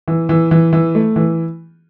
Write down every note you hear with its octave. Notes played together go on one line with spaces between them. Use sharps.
E3
E3
E3
E3
A3
E3